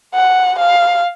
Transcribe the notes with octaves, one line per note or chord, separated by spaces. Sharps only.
F#5
F5